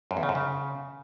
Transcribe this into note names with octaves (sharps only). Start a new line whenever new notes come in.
F#2
E2
C#3
F#2
C#3